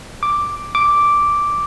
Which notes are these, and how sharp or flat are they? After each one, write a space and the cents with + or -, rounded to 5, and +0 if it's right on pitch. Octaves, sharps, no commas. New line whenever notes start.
D6 +0
D6 -5